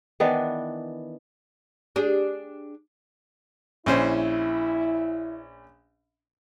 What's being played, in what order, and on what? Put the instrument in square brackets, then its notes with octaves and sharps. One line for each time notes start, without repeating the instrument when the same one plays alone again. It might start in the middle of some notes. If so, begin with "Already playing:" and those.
[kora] D#3 E3 B3 D4
[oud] D4 G4 G#4
[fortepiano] A#1 C#4 C5 [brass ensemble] E4